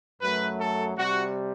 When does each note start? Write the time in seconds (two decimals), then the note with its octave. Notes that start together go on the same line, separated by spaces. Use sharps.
0.21 F#2 F#3 A3 B4
0.58 A4
0.96 C3 G3 F#4